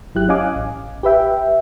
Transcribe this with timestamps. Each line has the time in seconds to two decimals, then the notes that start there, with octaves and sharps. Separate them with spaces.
0.15 G1 F#3 E4 G4 F#6
0.29 C#4 D#5 F5 G#5 D6
0.55 A1
1.03 G4 B4 E5 G5